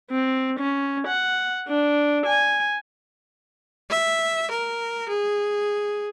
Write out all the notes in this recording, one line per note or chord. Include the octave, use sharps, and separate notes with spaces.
C4
C#4
F#5
D4
G#5
E5
A#4
G#4